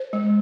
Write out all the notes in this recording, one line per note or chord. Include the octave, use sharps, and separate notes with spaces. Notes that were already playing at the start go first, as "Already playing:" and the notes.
Already playing: C5
G#3